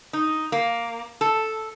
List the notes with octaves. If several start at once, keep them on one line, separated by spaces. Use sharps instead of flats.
D#4
A#3
A4